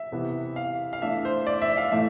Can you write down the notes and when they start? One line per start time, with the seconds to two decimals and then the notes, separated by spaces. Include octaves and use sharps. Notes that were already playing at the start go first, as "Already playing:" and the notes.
Already playing: E5
0.12 C3 E3 B3
0.56 F5
0.93 F5
1.02 E3 A3 D4 E5
1.25 C5
1.47 D5
1.62 E5
1.77 F5
1.92 A2 E3 A3 E5